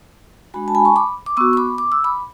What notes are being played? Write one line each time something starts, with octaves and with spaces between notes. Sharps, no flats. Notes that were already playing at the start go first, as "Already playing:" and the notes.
G#3 D4 F#4 G#5 B5
A5
G#5 B5
A5 C#6
B5 D6
D6
B3 F#4 C#6 E6
C#6
B5 D6
D6
E6
B5 D6